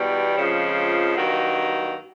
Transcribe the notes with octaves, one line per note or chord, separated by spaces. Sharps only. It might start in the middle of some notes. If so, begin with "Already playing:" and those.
Already playing: E2 B2 G3
F2 C#3 F3 G#3
G2 D#3 F#3 A#3